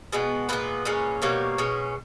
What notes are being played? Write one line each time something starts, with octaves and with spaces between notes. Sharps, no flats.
B2 G#3 B3
A#2 G#3 B3 B4
A#2 G#3 C#4
B2 G3 A#3 C#5
B2 G#3 C#4